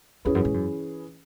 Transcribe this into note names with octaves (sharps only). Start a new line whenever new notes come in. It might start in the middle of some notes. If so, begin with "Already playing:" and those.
E2 E3 C#4 G#4 B4
F#2
G#2
F#2